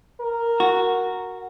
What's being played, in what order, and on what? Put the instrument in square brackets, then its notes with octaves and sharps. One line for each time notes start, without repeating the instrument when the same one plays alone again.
[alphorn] A#4
[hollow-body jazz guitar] F#4